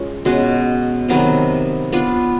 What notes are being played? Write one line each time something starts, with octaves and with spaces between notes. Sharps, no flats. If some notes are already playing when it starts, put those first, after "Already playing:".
Already playing: G#3 C#4 F4
B2 G#3 C#4 F#4
C3 D#3 F#3 B3
B3 D4 F4